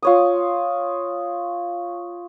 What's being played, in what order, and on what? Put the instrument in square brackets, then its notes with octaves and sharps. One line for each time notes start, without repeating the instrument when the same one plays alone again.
[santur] F4 C#5 D#6